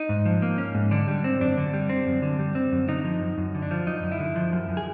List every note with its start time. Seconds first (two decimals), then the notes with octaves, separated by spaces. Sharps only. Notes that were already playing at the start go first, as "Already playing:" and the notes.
Already playing: D#4
0.09 G#2
0.26 F3
0.42 A#3
0.58 C#4
0.75 G#2
0.91 D3 D4
1.08 G3
1.24 C4
1.41 F#2 D4
1.58 D3
1.73 G3
1.89 C4
2.07 F#2
2.23 D3
2.39 G3
2.55 C4
2.72 F#2
2.89 D3 D#4
3.04 F3
3.21 F#2
3.38 F#2
3.55 D3
3.62 D4
3.71 F3
3.87 F#2 D#4
4.03 F#2
4.12 E4
4.20 D3
4.36 F3
4.52 F#2
4.68 F#2
4.77 G#4